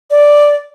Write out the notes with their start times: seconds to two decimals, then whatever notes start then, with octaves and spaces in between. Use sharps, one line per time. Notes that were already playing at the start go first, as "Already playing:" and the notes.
0.11 D5